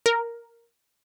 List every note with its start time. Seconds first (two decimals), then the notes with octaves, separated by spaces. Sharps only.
0.06 A#4